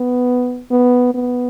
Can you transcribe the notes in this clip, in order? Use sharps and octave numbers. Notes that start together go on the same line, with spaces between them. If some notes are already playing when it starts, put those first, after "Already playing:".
Already playing: B3
B3
B3